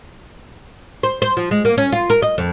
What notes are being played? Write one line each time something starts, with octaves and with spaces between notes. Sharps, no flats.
C5
C5
F3
G#3
A#3
C#4
F4
A#4
D#5
F2